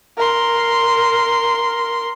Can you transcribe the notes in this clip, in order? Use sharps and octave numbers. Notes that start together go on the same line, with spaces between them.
A#4 C6